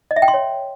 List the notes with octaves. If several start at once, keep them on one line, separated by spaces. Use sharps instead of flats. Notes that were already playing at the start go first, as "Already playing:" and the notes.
D#5
E5
G5
C6
C#5